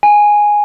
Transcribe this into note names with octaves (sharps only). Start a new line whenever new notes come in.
G#5